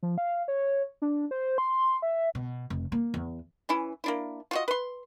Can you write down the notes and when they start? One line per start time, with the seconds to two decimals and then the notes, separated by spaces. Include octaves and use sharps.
0.03 F3
0.18 F5
0.48 C#5
1.02 D4
1.31 C5
1.58 C6
2.02 E5
2.35 B2
2.70 F1
2.92 A#3
3.14 E2
3.69 E3 C#4 E4
4.04 A#3 D4 E4
4.51 F4 F#4 D#5
4.68 B4 C6